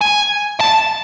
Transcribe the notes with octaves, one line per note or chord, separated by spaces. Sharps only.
G#5
A5